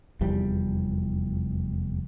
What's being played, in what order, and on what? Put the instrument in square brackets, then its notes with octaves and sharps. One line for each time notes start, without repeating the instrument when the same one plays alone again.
[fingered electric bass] F1 E2 G3